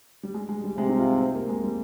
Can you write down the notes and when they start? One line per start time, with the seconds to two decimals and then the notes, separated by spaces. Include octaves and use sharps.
0.23 G3
0.34 G#3
0.49 G#3
0.64 G3
0.78 C3 G#3
0.89 D#4
0.98 F4
1.20 C4
1.35 A#3
1.49 G#3
1.63 G3